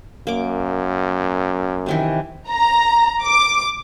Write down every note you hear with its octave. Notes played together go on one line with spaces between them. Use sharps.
F#2 A#3 D6
C3 D#3 E3
A#5
D6